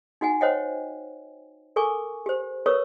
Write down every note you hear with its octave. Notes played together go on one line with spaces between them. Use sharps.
D#4 F#4 F#5 G#5
C5 C#5 D#5 F#5 G5
A4 A#4 G#5 C#6 D6
G4 C5
A#4 B4 C#5 C#6 D#6 E6